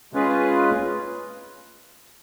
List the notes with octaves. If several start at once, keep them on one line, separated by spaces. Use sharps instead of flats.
G#3 C#4 F4 G#4 B4